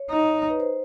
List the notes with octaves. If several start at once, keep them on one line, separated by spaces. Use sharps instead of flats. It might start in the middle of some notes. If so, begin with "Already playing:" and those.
Already playing: C#5
D#4
B4
C5